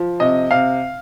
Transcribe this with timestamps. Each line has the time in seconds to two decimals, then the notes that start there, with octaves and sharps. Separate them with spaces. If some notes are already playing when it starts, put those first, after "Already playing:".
Already playing: F3
0.20 C3 D#5
0.51 C3 F5